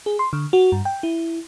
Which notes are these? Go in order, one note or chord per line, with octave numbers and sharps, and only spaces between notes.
G#4
C6
D3
F#4
G2
G5
E4